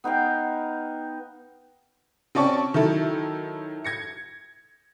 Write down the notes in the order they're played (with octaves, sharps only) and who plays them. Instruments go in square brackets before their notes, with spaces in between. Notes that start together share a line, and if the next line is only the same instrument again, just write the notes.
[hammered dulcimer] B3 D#4 F5 G5
[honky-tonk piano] C4 C#4 D5 A5 C#6
D#3 F#3 E4 A4
G#6 A#6 C#7